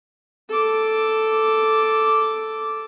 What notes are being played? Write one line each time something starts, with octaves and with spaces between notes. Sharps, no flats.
A4 D6